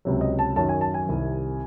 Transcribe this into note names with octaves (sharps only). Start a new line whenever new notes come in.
C#2 C3 F#3
D#5
A5
F#2 D#3 F#3 A5
G#5
A5
G#5
C2 C3 D#3